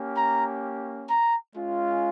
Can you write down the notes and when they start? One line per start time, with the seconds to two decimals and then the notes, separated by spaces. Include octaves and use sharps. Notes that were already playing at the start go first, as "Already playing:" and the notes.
Already playing: A#3 C#4 G4
0.15 A#5
1.08 A#5
1.55 G#3 C#4 F4